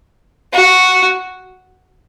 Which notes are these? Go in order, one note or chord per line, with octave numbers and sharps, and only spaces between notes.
F#4